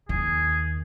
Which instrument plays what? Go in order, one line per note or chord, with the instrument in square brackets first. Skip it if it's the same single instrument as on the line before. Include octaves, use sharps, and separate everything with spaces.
[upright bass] D#2 [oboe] G#4